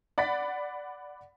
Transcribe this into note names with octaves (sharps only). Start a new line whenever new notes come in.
D5 F#5 B5 A6 B6